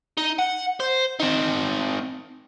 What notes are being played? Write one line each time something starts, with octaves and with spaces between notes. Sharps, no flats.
D#4
F#5
C5
C4 D#4